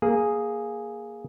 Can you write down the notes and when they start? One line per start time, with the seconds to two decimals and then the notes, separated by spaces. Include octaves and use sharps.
0.02 A#3 G#4